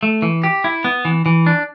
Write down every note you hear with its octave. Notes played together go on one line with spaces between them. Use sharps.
A3
E3
G4
E4
B3
E3
E3
D4